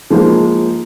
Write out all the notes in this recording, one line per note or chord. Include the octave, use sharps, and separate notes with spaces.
F3 G#3 A#3 D#4